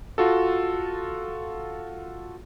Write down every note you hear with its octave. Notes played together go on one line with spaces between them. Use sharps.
F4 F#4 A4